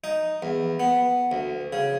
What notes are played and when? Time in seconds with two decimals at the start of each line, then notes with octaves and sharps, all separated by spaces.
0.04 D#4
0.42 E2
0.80 B3
1.32 D2
1.73 C#3